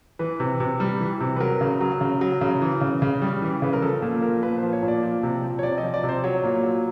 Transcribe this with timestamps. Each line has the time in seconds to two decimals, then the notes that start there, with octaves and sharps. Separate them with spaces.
0.19 E3 B4
0.40 C3
0.60 C3
0.80 G3
1.00 E3
1.21 C3
1.36 B4
1.40 F#3 A#4
1.61 C#3
1.81 F#3
2.01 C#3
2.21 F#3
2.41 C#3
2.62 E3
2.81 C#3
3.02 C#3
3.22 G3
3.42 E3
3.62 C#3 B4
3.73 A#4
3.82 F3 A4
4.02 A#2
4.22 F3 A#4
4.43 A#2 B4
4.58 C5
4.63 F3
4.73 C#5
4.83 A#2
4.88 D5
5.03 F3
5.23 C3
5.43 F3
5.59 C#5
5.63 C3 D5
5.78 D#5
5.83 F3
5.94 D5
6.03 C3
6.09 C5
6.24 F#3 C#5
6.44 A#2
6.64 F#3